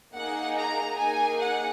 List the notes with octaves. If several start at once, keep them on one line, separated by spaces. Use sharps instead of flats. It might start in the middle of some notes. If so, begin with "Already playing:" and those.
A#3 D#4 G#4 F#5
A#5
A#3 D#4 G#4 G#5
F#5